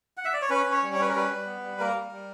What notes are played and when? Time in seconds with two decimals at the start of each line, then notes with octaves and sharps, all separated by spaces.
0.17 F#5
0.25 E5
0.33 D5
0.42 C#5
0.50 C#4 B4
0.66 C#4
0.72 C#5
0.82 G3
0.93 C#5
0.99 C#4 B4
1.09 A#4
1.15 G3 B4
1.31 G3
1.46 B3
1.63 G3
1.79 A#3 A#4
1.95 G3
2.12 G3